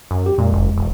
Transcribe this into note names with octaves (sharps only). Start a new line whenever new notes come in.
F#2
G4
F2 A#2 G#3
F#1
E1